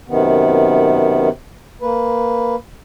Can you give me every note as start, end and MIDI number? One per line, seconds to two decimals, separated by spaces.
0.08 1.29 42
0.08 1.29 48
0.08 1.29 51
0.08 1.29 59
1.82 2.56 58
1.82 2.56 71